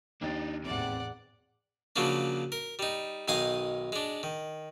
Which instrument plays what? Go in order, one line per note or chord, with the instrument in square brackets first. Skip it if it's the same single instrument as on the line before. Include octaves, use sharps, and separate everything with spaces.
[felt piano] D#2 A6 [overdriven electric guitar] D4 D#4
[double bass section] G#1 E2 A2 [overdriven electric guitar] C3 [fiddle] D5 F#5
[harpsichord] C#3 F3 F#3 A#3 D4
A#4
G3 D#4
B1 D#3 D#4 F5 G#5 D#6
G#3 D4
D#3